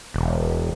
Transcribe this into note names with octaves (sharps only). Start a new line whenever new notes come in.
E1